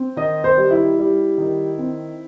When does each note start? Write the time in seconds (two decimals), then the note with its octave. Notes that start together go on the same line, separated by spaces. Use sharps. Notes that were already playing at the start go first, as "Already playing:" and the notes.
Already playing: C4
0.16 D#3 D#5
0.44 C5
0.57 G3
0.71 E4
0.98 G3
1.38 D#3
1.78 C4